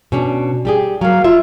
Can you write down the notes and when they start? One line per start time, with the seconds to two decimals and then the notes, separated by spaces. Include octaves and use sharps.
0.12 B2 C#4 D4
0.65 G3 G4 G#4
1.01 F#3 A#3 F5
1.24 F4 E5